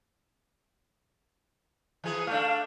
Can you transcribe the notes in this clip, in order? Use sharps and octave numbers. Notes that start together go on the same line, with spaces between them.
E3 G#4
A3 D4 F5